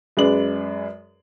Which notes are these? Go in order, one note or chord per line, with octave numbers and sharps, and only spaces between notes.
F#2 G#3 G#4 B4 D5 F#7